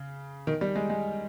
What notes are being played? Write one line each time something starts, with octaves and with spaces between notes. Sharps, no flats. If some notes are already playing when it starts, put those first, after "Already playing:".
Already playing: C#3
D#3
G3
G#3
G#3